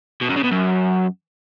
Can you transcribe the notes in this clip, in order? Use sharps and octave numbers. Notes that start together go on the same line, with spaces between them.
B2
F#2
C#3
B2
F#2